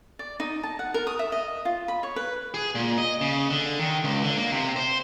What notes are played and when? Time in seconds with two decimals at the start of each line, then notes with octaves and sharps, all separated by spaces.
0.19 D5
0.40 D#4
0.63 A5
0.79 F#5
0.94 A#4
1.07 D#6
1.19 E5
1.32 D#5
1.65 F4
1.88 B5
2.03 C#5
2.16 B4
2.54 G#4
2.75 A#2
2.98 D#5
3.21 C#3
3.50 D3
3.79 D#3
4.04 C#2
4.23 D3
4.37 A#3
4.52 C3
4.76 C5